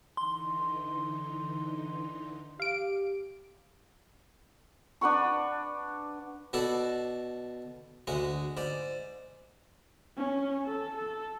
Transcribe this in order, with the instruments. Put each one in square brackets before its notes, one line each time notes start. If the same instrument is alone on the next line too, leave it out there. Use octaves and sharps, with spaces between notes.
[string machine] D3 E3 D#4 [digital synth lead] C6
[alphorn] G4 [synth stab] F5 D7
[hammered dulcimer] D4 B4 F#5 C#6
[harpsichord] B2 F#4 A4 D5
D2 G#3 F#4
G#2 D5
[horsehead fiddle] C#4
A4
A4